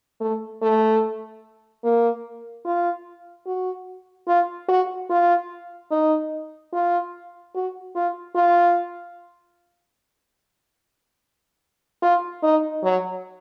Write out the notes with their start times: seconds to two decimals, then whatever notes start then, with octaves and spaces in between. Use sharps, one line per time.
0.21 A3
0.62 A3
1.84 A#3
2.65 F4
3.47 F#4
4.28 F4
4.68 F#4
5.10 F4
5.91 D#4
6.73 F4
7.55 F#4
7.95 F4
8.35 F4
12.02 F4
12.43 D#4
12.84 F#3